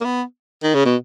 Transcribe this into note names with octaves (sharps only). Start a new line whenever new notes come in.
A#3
B3
D#3
C#3
B2